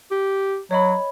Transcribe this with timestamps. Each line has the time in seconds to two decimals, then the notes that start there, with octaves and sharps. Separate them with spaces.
0.11 G4
0.71 F#3 C#5 D#5 B5